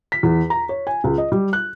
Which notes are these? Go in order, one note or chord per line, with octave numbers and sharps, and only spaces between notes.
B6
E2
A#5
C#5
G#5
C#2
D#5
G3
F#6